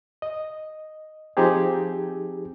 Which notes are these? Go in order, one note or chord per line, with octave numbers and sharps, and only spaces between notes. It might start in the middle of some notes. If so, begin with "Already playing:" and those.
D#5
F3 C4 D#4 G4 G#4